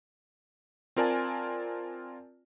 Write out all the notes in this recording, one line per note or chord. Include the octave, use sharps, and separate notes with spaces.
C4 F4 A#4 D5 G#5 A5